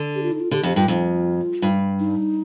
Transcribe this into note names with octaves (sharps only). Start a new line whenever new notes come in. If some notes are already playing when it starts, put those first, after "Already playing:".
Already playing: D3
G4
F4
D#4
F4
D3 G4
F2 G4
G2 F4
F2 F4
G2
D#4